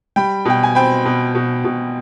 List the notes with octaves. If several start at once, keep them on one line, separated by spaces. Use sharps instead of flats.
G3 G5 B5
B2 G5
G#5
C4 G5 B5
B2
B2
B2